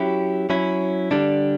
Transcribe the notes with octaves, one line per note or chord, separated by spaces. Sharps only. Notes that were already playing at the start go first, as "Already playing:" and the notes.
Already playing: F#3 C#4 E4 G4
F#3 C#4 E4
D3 G3 D4